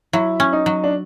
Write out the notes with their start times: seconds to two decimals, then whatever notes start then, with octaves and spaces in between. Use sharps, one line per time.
0.13 F#3 E4
0.40 C#4
0.53 D#4
0.66 F#3
0.84 D4